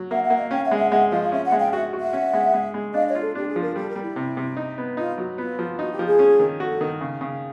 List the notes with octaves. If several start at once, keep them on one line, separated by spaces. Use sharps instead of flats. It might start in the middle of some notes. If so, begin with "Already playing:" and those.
Already playing: F#3
A#3 E5 F#5
E5 F#5
A#3
D#5 F5
C#4 F5 G5
E5 F#5
G#3
E5 F#5
G#3 E5 F#5
F3 D#5 F5
F5
C#4 D5 E5
E5 F#5
G#3
F5 G5
F#4 E5 F#5
F#4
E5 F#5
C#4
G#3
G#3
G#3
D4 D#5 F5
C#5 D#5
F4
A4
D4 G4
G#4
F3
A#4
G3 A4
A#4
G3
E4
C3
C3
D#4
B3
D#4 F4
F#3
B3 F4
F3
D#4 F#4
G4
F3
G#4
C#4
D#3
F#4 A4
D#3
C#3
C#3